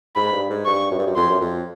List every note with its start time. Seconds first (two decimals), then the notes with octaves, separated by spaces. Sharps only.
0.16 G#2 B5
0.33 G2
0.50 G#2
0.66 G2 C#6
0.91 F#2
0.99 G2
1.07 F#2
1.16 F2 C6
1.29 F#2
1.41 F2